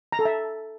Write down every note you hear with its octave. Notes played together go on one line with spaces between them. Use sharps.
A#5
A4
E5